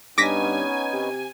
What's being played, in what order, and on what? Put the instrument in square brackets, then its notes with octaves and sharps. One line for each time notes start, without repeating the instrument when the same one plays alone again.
[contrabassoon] G2 [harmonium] B3 C#4 D#4 [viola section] G#5 [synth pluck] D6 A#6 B6
[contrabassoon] C3